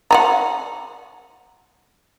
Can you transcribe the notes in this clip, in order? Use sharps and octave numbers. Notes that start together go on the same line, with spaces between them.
F#5 G#5 A#5